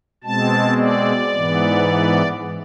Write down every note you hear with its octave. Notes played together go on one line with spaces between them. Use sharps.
B2 G#3 C4 A5
D5
G#2 E3 B3